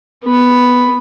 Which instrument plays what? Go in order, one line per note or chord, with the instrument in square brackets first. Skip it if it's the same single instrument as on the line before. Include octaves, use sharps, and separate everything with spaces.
[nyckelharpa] B3 B5